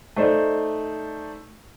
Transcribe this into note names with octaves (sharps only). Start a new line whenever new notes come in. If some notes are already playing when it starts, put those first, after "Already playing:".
A3 D#4 C5 D5